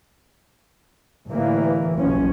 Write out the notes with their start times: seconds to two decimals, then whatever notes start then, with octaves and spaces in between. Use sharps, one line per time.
1.27 G1 A2 E3 A#3
1.97 F#1 B1 F3 C#4